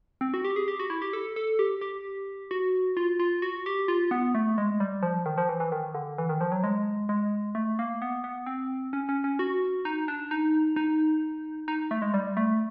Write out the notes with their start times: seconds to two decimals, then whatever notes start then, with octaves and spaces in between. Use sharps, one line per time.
0.21 C4
0.34 F#4
0.45 G4
0.56 G#4
0.68 G4
0.79 F#4
0.90 E4
1.02 G4
1.13 A4
1.36 A4
1.59 G4
1.81 G4
2.51 F#4
2.97 F4
3.19 F4
3.42 F#4
3.66 G4
3.88 F4
4.11 B3
4.35 A3
4.58 G#3
4.80 G3
5.02 F3
5.26 D#3
5.38 F3
5.49 E3
5.60 E3
5.72 D#3
5.95 D3
6.18 E3
6.29 D#3
6.41 F3
6.52 F#3
6.64 G#3
7.09 G#3
7.55 A3
7.79 A#3
8.02 B3
8.24 B3
8.46 C4
8.93 C#4
9.09 C#4
9.24 C#4
9.39 F#4
9.85 D#4
10.08 D4
10.31 D#4
10.76 D#4
11.68 D#4
11.91 A3
12.02 G#3
12.14 G3
12.37 A3